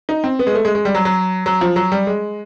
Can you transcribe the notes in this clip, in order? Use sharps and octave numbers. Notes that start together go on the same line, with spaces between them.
D#4
C4
B3
G#3
A3
G#3
G#3
G3
F#3
F#3
F#3
F3
F#3
G3
G#3